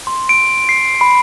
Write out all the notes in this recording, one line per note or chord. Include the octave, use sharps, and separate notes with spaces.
C6
D7
C7
B5